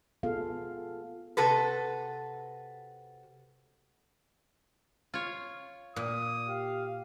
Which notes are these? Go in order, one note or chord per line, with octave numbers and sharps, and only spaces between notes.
B3 F4 G#4 A4 F5
C3 F#4 A4 B4
F4 C#5
A#2 D#6
G4 F5